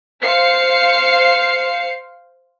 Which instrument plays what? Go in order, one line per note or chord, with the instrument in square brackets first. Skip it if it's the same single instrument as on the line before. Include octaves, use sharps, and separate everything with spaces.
[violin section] C5 F5 C7 C#7